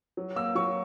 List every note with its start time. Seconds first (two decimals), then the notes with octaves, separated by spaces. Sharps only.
0.17 F#3
0.36 A#3 E6
0.55 F#3 C#6